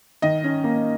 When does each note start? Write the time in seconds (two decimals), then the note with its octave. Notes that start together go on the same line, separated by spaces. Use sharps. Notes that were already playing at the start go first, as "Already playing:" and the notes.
0.22 D#3 D#5
0.44 C#4
0.64 A#3